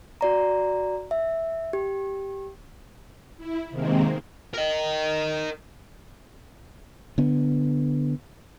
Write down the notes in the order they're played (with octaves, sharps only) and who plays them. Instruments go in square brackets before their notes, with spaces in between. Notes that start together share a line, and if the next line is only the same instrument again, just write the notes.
[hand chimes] F#4 D5 A#5
E5
G4
[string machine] E4
C3 D#3 G#3 A#3 C4
[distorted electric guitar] A#4 D#5
[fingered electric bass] D3 B3